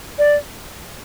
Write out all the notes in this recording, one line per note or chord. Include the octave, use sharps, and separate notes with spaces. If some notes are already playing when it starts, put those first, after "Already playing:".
D5